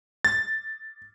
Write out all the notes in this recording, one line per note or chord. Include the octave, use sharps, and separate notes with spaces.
A6